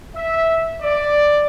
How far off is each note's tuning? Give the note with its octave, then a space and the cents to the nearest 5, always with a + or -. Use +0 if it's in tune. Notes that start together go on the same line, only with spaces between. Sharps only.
E5 -10
D5 +5